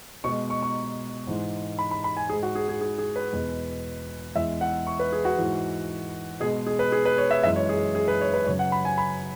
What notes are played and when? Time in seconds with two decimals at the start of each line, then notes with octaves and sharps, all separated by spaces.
0.24 B2 G#3 C#6
0.50 C#6
0.63 C#6
1.27 G#2 E3 G#3
1.79 B5
1.91 B5
2.04 B5
2.17 G#5
2.30 G#2 G#3 G#4
2.43 F#4
2.55 G#4
2.69 G#4
2.81 G#4
2.98 G#4
3.16 B4
3.33 E2 B2 G#3
4.35 E2 E3 G#3 E5
4.61 F#5
4.87 C#6
5.00 B4
5.12 G#4
5.25 F#4
5.38 G#2 E3 G#3
6.40 B2 G#3 G#4
6.67 G#4
6.79 B4
6.92 G#4
7.05 B4
7.18 C#5
7.31 E5
7.43 F#2 E3 G#3 E5
7.56 C#5
7.69 G#4
7.95 G#4
8.08 B4
8.21 C#5
8.34 B4
8.46 F#2 C#3 F#3 C#5
8.59 F#5
8.72 B5
8.85 G#5
8.98 B5